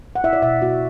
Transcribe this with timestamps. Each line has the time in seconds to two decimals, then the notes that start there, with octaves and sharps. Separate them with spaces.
0.15 F#5
0.24 E4 E5
0.33 D5
0.43 B2 E5
0.62 B3 F#4